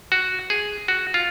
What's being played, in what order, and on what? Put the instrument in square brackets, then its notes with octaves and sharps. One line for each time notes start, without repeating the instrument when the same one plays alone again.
[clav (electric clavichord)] F#4
G#4
F#4
F4